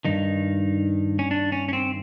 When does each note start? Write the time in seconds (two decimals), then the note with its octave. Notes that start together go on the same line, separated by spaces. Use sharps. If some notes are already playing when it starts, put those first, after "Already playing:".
0.05 G2 D#3 D#4
1.19 C#4
1.31 D4
1.52 C#4
1.69 C#4
1.73 C4